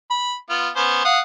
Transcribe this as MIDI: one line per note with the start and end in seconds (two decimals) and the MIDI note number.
0.11 0.35 83
0.50 0.69 59
0.50 0.69 65
0.76 1.03 59
0.76 1.03 61
0.76 1.03 72
1.05 1.20 77
1.05 1.20 78
1.05 1.20 87